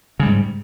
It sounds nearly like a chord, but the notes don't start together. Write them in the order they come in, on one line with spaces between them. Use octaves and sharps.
C#3 G3 G#2